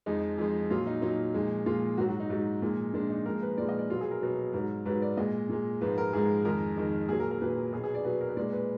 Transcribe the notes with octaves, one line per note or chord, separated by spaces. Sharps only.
F2 F3 G#3 D#4
F2 F3 G#3
A#2 F#3 F4
D#4
A#2 F#3 D#4
A#2 F3 G#3
A#2 F3 G#3 F4
G#2 F#3 F#4
F#4
D#4
G#2 F#3
A#2 F3 G#3
A#2 F3 G#3 D4
D#4
A#2 F3 G#3 A#4
B4
A#2 F3 G#3 D5
D#5
D5
B2 F#3 F4
G#4
A#4
B2 F#3
G#2 F#3
G#2 F#3 B4
D5
A#2 G#3 D#5
A#2 G#3
G#2 F3 G#3 B4
A#4
G#2 F3 G#3 G#4
F2 D#3 G#3 A#4
F2 D#3 G#3
A#2 F#3 G#4
A#4
A#4
A#2 F#3 B4
B2 F#3 G#4
G#4
D5
B2 F#3 B4
A#4
B4
A#2 G#3 D5
B4